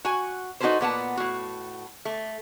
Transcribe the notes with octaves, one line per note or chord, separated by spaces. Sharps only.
F#4 G#5
D#4 F#4 G#4 A4 B4 C5
A#2 B3 F#5 A5
A2 F#4
A3